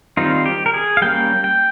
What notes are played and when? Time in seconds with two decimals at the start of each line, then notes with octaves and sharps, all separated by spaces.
0.17 D#3 G3 C4 D#4 F4
0.46 G4
0.66 A#4
0.74 G#4
0.97 F5
1.02 G3 A#3 C#4 G5
1.44 G5